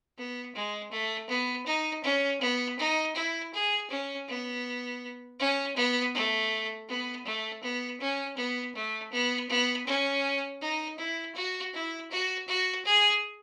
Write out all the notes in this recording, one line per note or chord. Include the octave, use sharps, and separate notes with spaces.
B3
G#3
A3
B3
D#4
C#4
B3
D#4
E4
G#4
C#4
B3
C#4
B3
A3
B3
A3
B3
C#4
B3
A3
B3
B3
C#4
D#4
E4
F#4
E4
F#4
F#4
G#4